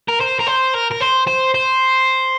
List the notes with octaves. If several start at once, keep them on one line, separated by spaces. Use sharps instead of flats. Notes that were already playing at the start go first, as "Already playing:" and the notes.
A#4
C5
A#4
C5
A#4
A#4
C5
C5
C5